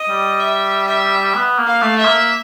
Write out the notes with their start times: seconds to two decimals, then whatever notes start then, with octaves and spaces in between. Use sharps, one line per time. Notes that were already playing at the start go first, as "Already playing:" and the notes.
Already playing: D#5
0.09 G3
0.40 E5
0.87 E5
1.35 B3
1.58 A#3
1.67 F5
1.82 A3
1.98 E5
2.05 A#3